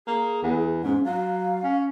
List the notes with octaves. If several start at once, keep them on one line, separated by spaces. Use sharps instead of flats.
A#3 G#4
E2
G#2 C#4
F#3 F5
C#4